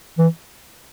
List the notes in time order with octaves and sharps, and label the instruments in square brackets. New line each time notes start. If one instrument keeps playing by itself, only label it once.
[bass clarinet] E3